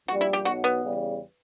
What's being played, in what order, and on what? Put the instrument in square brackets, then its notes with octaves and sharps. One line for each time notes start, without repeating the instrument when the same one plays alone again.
[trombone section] A#1 A#2 G3 [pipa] F#4
[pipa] E4
G4
[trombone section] B1 B2 F#3 [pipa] F#4
[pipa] B3
[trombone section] E2 C#3 G3